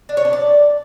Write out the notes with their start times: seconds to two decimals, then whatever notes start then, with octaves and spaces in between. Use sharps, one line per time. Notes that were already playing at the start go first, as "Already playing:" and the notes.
0.09 D4
0.17 C#5
0.25 D4
0.33 D5